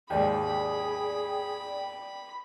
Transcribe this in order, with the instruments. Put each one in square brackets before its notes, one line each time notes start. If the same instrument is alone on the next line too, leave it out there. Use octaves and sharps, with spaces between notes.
[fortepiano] D#2 G#2 [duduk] G#4 [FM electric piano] D5 G5 [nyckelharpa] B5